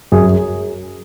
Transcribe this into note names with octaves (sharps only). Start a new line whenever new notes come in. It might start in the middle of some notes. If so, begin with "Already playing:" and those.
F#2 G#4